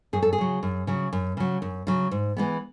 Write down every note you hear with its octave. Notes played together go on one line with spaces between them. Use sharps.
F#2 G#4
A4
G#4
C#3 F#3
F#2
C#3 F#3
F#2
C#3 F#3
F#2
C#3 F#3
G#2
E3 G#3 B3